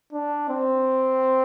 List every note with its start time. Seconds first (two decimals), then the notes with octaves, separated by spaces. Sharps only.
0.13 D4
0.49 C4